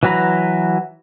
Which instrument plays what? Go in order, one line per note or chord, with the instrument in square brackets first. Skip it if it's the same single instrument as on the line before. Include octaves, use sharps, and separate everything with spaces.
[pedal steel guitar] E3 F#3 F#4 B4 A#5